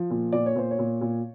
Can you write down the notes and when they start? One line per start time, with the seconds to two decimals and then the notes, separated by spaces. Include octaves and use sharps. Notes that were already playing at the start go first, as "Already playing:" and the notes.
Already playing: F3
0.10 A#2
0.33 A#2 D5
0.46 C#5
0.55 A#2 C5
0.71 C#5
0.79 A#2
1.01 A#2